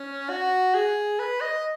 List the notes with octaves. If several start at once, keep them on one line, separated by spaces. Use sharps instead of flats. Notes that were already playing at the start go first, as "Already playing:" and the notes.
Already playing: C#4
F#4
G#4
B4
D#5